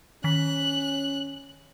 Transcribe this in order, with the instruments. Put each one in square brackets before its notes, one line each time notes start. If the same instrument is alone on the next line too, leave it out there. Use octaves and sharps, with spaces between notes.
[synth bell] D#3 B6 [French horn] C#4 [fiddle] F#6